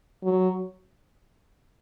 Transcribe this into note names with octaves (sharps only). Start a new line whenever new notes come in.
F#3